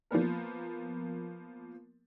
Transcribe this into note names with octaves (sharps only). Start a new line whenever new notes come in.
F3 A#3 B3 A#4